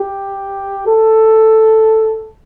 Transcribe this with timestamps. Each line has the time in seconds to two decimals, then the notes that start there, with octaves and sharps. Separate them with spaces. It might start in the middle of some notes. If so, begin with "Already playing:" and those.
Already playing: G4
0.87 A4